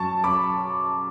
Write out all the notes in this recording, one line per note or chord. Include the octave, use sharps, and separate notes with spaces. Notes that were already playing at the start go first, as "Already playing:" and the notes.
Already playing: F#2 A5 C#6
F#2 B5 D6